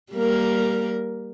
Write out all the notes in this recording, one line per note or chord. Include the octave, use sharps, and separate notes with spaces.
G3 A#3 A#4